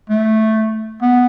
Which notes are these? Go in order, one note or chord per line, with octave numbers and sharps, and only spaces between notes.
A3
B3